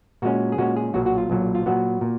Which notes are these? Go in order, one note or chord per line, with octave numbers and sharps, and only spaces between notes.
A#2 G#3 C#4 F#4
G#4
A#2 G#3 C#4 F#4
G#4
B1 A#2 F#3 F#4
F#4
F4
B1 A#2 F#3
F4
A#2 F#3 B3 F#4
A#2